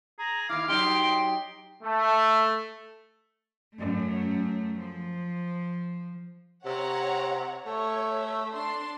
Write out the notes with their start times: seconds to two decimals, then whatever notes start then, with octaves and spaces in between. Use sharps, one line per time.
0.19 G#4 A#5
0.49 D#2 E4 F5 D6
0.68 F#3 D#4 G4 C6 D7
1.84 A3
3.75 F#2 A3
4.78 F3
6.66 C3 C#5 F#5 A#5
7.66 A3 C#5
8.52 D4 C6